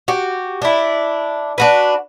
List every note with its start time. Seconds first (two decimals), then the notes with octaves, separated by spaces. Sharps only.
0.08 F#4 G4
0.62 D4 E4
1.58 D4 F#4 B4